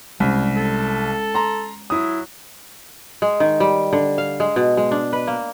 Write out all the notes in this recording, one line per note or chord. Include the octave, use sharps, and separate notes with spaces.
C2 G3 G#3 C4 C#4
A4
A#5 C6
F#3 E4 D#6
G#3
D#3
G3
D3
F5
G#3
B2
G#3
D4
B4
A#3